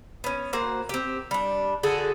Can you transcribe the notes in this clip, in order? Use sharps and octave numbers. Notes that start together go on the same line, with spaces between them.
B3 C#4
A#3 F#4 C5
C4 G4
G3 D4
D3 F#4 G#4 A4